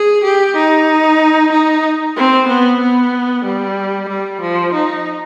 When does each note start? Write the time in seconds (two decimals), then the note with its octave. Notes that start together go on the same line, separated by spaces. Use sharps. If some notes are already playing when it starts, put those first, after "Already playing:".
Already playing: G#4
0.23 G4
0.56 D#4
1.52 D#4
2.17 C4
2.48 B3
2.80 B3
3.45 G3
4.08 G3
4.41 F3
4.74 D#4